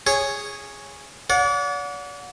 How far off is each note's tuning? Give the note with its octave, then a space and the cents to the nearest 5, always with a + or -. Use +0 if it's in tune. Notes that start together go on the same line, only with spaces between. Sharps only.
G#4 -10 C#5 +0
D5 -40 F#5 -30